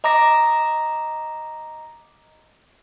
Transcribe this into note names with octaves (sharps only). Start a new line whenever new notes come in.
D#5 A#5 D6 A#6